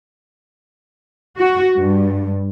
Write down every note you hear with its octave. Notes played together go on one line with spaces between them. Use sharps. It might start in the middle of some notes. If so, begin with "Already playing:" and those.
F#4
G2